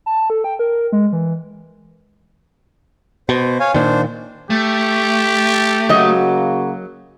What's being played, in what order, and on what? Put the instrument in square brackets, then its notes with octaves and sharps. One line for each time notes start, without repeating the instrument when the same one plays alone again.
[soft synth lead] A5
A4
G5
A#4
G#3
E3
[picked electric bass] B2 [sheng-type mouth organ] C5
[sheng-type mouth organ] C#5 F5 G#5
[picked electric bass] A#2 D#3 [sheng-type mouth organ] D4 C5
[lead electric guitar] A3 [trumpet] G4
[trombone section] C#3 A#3 F#4 [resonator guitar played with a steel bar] F#3 D#5